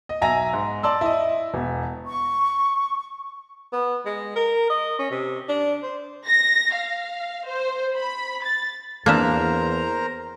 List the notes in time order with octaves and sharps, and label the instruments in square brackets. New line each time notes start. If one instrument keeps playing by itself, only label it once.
[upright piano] D#5
B1 E5 G#5 A#5 A#6
G#2
D5 A5 C6 E6
E4 D#5
E1
[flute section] C#6
[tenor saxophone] B3
G#3
A#4
D#5
C#4
C3
D4
C5
[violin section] A#6
F5
C5
B5
A6
[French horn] E2 [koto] A#3 D4 E5 [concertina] A#4 C5 A#5